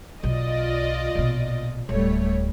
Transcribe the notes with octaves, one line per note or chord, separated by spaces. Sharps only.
B1 F4 D5 D#5
A#1 B2
D1 G3 A3 C#5